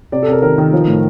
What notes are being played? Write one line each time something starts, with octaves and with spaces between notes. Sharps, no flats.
C3 D5
A4
C3 A#4
D#3 A#4
D#3
F3
A2